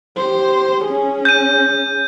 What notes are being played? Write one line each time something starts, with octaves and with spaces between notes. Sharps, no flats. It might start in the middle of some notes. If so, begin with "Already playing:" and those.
G4 C5
C#4 G#4
G6 D#7